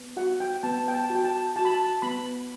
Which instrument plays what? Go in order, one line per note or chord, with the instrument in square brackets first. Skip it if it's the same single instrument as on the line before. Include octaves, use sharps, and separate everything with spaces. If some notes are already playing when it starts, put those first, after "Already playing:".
Already playing: [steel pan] B3
F#4 F#5
G5
B3 A5
G5
A5
F#4
G5
A5
F#4 A5
B5
A5
B3 B5